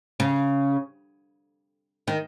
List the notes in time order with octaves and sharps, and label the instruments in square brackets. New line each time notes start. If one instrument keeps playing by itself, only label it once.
[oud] C#3
D#3